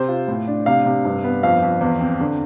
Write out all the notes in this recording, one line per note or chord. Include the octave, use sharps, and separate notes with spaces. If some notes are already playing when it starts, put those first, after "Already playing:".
Already playing: C3 C5
F4
A2
D4
C3 F5
C3
G2
B3
F2 F5
F2
E2
C4
D3